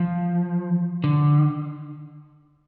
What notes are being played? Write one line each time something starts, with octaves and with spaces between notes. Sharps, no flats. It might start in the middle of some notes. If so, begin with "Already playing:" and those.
Already playing: F3
D3